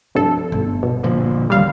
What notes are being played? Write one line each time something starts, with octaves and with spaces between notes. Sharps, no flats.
C2 G2 F3 A4
G1
B2
A#2 D3 F3
D#2 D3 F#3 G3 F5